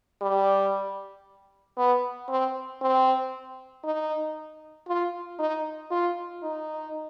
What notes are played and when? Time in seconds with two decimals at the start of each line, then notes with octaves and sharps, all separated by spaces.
0.21 G3
1.77 B3
2.29 C4
2.81 C4
3.84 D#4
4.88 F4
5.39 D#4
5.91 F4
6.43 D#4